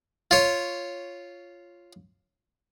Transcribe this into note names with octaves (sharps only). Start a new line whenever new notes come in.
F4 C#5